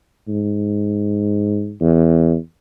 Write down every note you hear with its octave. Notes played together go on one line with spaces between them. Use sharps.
G#2
E2